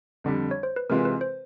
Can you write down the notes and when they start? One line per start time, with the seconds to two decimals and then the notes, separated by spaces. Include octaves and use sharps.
0.24 F2 D3 G3
0.51 C#5
0.63 C5
0.76 B4
0.90 C3 E3 G#3 C4 F4 A#4
1.05 B4
1.21 C5